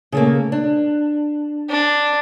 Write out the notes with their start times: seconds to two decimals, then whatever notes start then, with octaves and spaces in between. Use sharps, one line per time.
0.12 C#3 A3 A#3
0.52 D4
1.70 D4